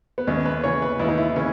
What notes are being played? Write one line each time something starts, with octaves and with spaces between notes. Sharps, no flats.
B3
D#2 C#4
B4
C#3 E3 C#5
B4
D#2 E4
D#4
E4
C#3 E3 C#4